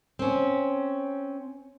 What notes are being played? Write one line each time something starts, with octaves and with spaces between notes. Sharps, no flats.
C4 C#4